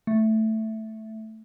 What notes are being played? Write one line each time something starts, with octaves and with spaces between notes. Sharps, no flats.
A3